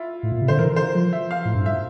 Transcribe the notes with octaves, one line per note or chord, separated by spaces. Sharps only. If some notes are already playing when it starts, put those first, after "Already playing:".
Already playing: E4 F4
A2
A#2
C3
D3 C5
E3 A#4
C5
F3
E5
F5
A2
G2
E5